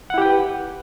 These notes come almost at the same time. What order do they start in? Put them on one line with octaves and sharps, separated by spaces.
F#5 E4 G4 G5 B4